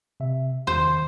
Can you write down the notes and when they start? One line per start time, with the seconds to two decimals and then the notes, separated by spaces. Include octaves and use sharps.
0.20 C3 E5
0.67 E2 D#3 C5